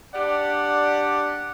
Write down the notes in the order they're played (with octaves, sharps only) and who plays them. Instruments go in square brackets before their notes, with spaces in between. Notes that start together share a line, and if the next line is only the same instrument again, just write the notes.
[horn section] D4 G4 D5 F#5